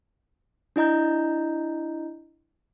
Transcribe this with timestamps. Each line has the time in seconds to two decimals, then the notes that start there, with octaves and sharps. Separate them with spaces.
0.76 D4 E4 D#5 A#5 G6